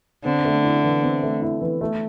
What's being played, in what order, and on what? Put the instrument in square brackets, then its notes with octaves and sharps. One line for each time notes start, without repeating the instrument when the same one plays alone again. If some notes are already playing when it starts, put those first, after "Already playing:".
[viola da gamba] D3 [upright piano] C4
[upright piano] A3
E4
E3
C4
A3
E4
E3
A3